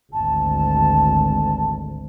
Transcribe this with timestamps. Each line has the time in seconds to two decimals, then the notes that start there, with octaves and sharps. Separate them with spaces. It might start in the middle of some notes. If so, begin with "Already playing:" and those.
0.13 G#1 D2 A5